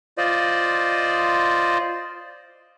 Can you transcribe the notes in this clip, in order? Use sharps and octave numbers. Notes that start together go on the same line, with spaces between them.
F4 C5 D5 D#5